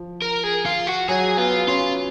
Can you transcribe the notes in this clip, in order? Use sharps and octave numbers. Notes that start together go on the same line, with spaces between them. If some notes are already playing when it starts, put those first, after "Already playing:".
Already playing: F3
A#4
G#4
F4
F#4
F#3 G#4
B3 F4
C#4 F4